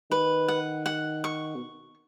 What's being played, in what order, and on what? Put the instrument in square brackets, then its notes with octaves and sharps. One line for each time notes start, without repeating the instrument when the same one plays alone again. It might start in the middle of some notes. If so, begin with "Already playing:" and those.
[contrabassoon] D#3 [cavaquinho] B4
[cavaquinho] F#5
F#5
C#6
[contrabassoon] B2